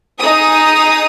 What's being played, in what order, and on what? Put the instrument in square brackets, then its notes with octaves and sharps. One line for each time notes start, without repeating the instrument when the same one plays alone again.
[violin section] D#4 G#4 D#6